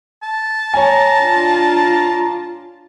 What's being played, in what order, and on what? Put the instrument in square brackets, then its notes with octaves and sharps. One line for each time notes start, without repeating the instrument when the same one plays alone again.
[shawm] A5
[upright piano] C#5 G#5 [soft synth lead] A#5
[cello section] D4 F4